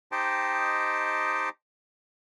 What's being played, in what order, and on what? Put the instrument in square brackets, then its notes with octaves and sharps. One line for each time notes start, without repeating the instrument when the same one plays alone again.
[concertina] D#4 G4 C5 D#5 G5 A5